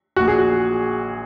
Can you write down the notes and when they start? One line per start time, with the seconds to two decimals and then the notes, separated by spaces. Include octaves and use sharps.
0.16 A#1 A#2 F#4
0.28 G#4
0.39 F#4